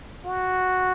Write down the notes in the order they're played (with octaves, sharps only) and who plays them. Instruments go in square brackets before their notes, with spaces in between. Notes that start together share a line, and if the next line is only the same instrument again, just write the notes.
[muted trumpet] F#4